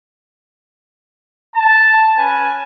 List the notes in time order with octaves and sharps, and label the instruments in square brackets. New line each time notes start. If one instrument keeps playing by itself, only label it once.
[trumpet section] A5
C#4 B4 G#5